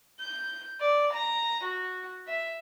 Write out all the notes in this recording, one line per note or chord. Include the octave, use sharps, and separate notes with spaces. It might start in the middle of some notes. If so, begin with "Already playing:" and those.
G6
D5
A#5
F#4
E5